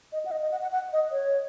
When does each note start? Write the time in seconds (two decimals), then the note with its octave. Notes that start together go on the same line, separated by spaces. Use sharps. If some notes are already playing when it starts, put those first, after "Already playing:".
0.12 D#5
0.26 F#5
0.31 D#5
0.42 D#5
0.51 F#5
0.62 F#5
0.72 F#5
0.93 D#5
1.12 C#5